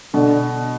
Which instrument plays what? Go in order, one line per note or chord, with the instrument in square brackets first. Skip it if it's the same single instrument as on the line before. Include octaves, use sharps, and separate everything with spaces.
[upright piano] B2 [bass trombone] D3